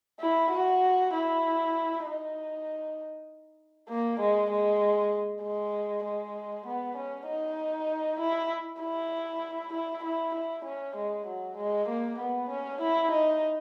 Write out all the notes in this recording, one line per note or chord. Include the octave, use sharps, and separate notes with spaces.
E4
F#4
E4
D#4
A#3
G#3
G#3
G#3
G#3
B3
C#4
D#4
E4
E4
E4
E4
E4
C#4
G#3
F#3
G#3
A#3
B3
C#4
E4
D#4